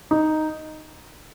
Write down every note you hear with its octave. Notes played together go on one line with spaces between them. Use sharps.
D#4